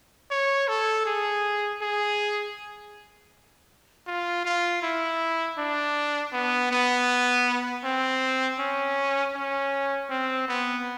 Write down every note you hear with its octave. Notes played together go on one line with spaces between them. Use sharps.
C#5
A4
G#4
G#4
F4
F4
E4
D4
B3
B3
C4
C#4
C#4
C4
B3